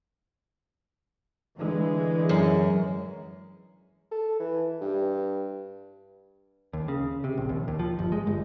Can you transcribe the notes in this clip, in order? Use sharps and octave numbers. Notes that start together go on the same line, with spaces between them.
D3 E3 G#3
F#2
A4
E3
G2
D#2
C#3
C3
A#1
D#2
D#2
F3
G1
G#3
G1